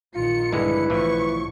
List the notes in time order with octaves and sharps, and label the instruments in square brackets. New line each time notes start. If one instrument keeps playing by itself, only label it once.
[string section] A#1 D#3 C#7 [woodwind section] F4
[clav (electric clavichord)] G2 D3 G#3 [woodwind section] E4 [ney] B4
[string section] B1 D3 C#6 [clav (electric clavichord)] A2 E3 F3